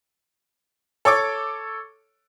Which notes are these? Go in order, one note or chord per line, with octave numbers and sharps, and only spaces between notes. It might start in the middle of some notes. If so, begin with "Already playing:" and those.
A4 C#5 C#6 D6